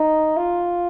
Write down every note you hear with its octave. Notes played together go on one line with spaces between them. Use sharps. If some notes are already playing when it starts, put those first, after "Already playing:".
Already playing: D#4
F4